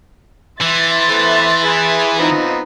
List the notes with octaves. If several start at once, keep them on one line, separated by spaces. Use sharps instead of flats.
E3 E5 C6 A6
A3 B3 C5
E4 G#4 B4
F3 B3 C4 D#4